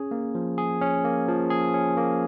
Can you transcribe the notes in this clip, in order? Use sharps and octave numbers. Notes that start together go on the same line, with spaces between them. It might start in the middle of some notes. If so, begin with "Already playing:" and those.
Already playing: C#4 G#4
A#3
F3
G#4
C#4
A#3
F3
G#4
C#4
A#3